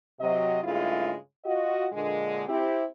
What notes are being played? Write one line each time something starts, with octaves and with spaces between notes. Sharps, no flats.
C3 F#3 D#5
G2 C#3 G#3 A3 E4 F4
F4 F#4 D#5
A#2 D3 G#3
C4 E4 G4